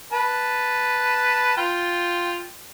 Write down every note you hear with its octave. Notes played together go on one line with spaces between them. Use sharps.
B4 A5
F4 G5